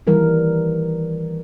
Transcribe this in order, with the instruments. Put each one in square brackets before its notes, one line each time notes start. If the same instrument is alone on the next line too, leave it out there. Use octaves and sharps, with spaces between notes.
[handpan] D#3 E3 G3 A#4